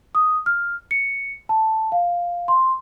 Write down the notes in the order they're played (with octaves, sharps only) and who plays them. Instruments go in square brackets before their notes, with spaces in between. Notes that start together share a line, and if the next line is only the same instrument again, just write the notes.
[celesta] D#6
F6
C#7
A5
F5
C6